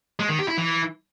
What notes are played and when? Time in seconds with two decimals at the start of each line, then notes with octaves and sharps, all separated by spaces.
0.20 G#3
0.29 D#3
0.39 G4
0.48 E4
0.58 E3